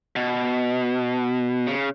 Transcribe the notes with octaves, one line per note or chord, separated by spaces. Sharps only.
B2
C#3